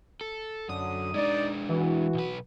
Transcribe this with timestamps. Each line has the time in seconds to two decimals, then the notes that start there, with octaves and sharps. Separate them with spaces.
0.21 A4
0.69 F#2 D3 F#3 D#6
1.14 G#3 D4 D#4 D5
1.69 E3 F#4
2.14 B1 B4